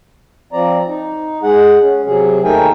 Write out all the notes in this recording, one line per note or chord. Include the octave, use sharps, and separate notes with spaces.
F3 C4 D5 A#5
D#4
G#3 G#4 F#5
C#4
C3 F#3 G#4
D#2 A3 D#4 A#4 G5 G#5